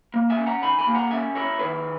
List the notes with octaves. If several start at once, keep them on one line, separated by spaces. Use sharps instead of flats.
A#3
E5 G#5
C#4
F#5 A#5
D#3 G#5 B5
G#5 B5
A#3
F#5 A#5
C#4 E5 G#5
E4 A#4 C#5
D#3 G#4 B4